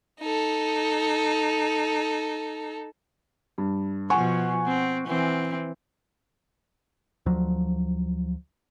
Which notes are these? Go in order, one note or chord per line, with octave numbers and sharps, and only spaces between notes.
D#4 A4
G2
B2 F3 F#5 G#5 C#6
C4
E3 C4
D2 F3 F#3